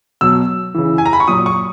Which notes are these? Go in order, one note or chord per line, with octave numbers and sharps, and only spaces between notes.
B2 F#3 E6
C#3 E3
G#5
A#5
B5
C#6
A#2 F#3 D#6
C#6